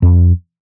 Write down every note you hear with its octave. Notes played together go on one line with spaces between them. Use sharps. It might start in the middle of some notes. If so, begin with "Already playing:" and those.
F2